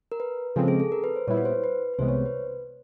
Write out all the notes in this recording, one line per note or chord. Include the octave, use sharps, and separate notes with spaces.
A#4
B4
C#3 F3 G#3 C4 A4
G#4
A4
A#4
B4
C5
A#2 G3 B3 E4 C#5
B4
C5
B4
B4
C2 C3 E3 G#3 B3 C5
C#5
C5
B4